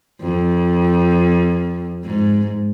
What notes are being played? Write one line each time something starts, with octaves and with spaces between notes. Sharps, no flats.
F2
G#2